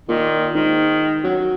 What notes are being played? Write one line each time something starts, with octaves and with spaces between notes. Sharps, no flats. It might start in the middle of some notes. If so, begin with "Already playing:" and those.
A#2 D#3
G#2 D#3
F#3